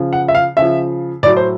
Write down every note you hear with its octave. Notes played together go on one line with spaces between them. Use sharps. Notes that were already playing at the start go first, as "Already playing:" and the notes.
Already playing: C#3 F3
F#5
E5
F5
C#3 F3 E5
A2 F#3 D5
C5